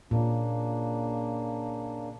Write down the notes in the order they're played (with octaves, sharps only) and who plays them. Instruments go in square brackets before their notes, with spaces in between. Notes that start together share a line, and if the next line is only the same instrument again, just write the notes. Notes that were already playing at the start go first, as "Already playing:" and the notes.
[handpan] A#2 [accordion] C#3 A#3 D4